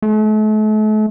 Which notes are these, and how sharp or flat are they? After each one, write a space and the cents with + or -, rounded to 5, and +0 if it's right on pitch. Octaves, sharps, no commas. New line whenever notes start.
A3 -40